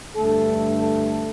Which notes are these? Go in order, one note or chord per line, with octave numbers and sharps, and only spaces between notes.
G2 D3 A3 A4
A4